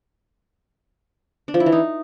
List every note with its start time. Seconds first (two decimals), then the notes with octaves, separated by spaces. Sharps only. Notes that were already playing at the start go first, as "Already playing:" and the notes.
1.48 D4
1.54 F3
1.60 E4
1.66 E3
1.72 D#4